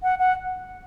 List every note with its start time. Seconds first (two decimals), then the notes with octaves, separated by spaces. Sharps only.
0.02 F#5
0.18 F#5